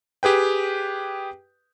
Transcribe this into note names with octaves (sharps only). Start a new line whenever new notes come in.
G4 G#4 B4 G5